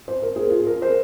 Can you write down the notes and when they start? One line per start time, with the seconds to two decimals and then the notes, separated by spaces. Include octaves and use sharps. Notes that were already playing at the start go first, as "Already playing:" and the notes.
0.08 C5
0.22 A#4
0.36 G#4
0.50 F4
0.67 A#4
0.82 C5